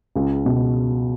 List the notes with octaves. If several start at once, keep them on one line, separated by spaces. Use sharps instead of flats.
C#2
B2